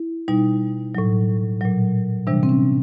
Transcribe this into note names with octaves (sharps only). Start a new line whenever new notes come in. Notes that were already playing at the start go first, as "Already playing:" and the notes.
Already playing: E4
B2 G3 D#4
A2 F#3
A#2 F#3
C3 E3 G3 D4
C4
C#4